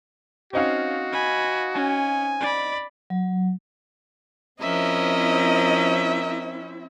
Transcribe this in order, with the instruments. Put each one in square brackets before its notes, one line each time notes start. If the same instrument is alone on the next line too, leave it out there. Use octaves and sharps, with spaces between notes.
[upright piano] C4 D#4 F5 [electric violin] C#4 [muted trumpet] F#4
[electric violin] G#5 B5
[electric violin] C#4 [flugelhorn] G#5
[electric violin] D5 B5
[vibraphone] F#3
[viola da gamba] F3 C#4 [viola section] C4 E4 [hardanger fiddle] A#4 D#5 [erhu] E5